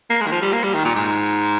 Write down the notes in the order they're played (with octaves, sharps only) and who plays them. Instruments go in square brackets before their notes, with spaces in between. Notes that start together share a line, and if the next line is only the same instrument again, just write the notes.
[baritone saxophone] A#3
G#3
D#3
F3
G3
A#3
G3
D#3
A#2
G#2